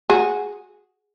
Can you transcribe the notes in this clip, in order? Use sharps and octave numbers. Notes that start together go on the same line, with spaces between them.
F#4 G#4